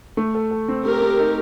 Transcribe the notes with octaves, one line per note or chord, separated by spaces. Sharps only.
A3
A4
A4
C4
A3 G4 A#4
C4
D#4